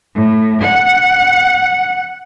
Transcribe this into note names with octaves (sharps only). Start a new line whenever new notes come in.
A2
F#5